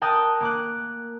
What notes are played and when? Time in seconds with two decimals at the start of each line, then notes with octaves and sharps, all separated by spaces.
0.01 A#4 G5 A5 D#6 F#6 G6
0.41 A#3 D6 F#6